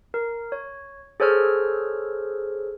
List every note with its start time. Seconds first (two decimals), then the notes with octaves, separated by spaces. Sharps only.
0.14 A#4
0.52 C#5
1.20 G#4 A4 C5 C#5 F6